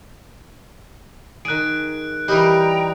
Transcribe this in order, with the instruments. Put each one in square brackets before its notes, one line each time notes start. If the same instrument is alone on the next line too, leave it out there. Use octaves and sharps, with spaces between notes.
[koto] D#3 G#4 [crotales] F#6 D7
[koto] E3 G3 [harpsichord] D#4 G4 A#4 [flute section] G5 A#5